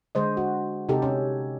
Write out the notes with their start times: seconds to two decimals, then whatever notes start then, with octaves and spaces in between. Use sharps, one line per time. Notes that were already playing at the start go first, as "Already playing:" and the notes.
0.15 D3 G#3 C5 D#5
0.37 F#4
0.89 C3 D#4 G4 A4
1.02 C#4